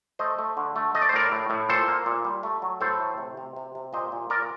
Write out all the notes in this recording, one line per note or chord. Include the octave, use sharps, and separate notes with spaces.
A3 C5 D#5
A3
D3
A3
A3 D#5
D5
C5
A2 A#4 D5
A2
A2
A#2 A4 C5
A#3
A#2
G3
A3
F#3
A2 A4 C5
A3
C3
C3
C3
C3
A#2 C5 D#5
A#2
A#2 A#4 D5